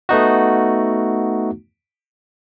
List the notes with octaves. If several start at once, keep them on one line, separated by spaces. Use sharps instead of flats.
A3 B3 D#4 F#4